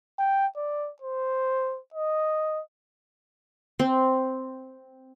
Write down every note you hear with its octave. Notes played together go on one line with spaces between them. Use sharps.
G5
D5
C5
D#5
C4